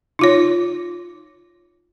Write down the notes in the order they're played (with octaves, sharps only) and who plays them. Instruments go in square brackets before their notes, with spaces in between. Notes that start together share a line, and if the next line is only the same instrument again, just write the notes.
[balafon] D#4 F4 C#5